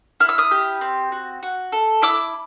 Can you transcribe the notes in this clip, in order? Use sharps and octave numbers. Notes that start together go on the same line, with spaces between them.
E4 F6
E6
D#6 F6
G4
C4
F#4
F#4
A4
E4 D6 E6